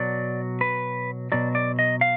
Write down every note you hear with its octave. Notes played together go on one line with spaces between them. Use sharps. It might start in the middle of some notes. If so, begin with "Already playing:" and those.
Already playing: B2 F#3 D5
B4
B2 F#3 D5
D5
D#5
F5